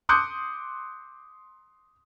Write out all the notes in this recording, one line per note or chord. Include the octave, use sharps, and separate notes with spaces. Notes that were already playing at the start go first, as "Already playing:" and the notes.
C6 D6 D#6 F#6 G6 C#7